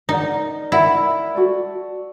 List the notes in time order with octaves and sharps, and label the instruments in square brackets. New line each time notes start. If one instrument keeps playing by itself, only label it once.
[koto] D#4 [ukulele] A#4 D5 F#5
[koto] E4 [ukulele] A#4 D5 F#5
[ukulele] F#4 A4 D5